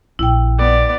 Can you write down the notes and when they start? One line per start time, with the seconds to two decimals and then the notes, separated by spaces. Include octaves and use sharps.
0.19 A#1 E4 G5
0.58 B3 D5